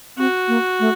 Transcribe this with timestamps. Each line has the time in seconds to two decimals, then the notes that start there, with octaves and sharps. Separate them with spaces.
0.17 C4 F#4
0.48 A#3
0.80 A3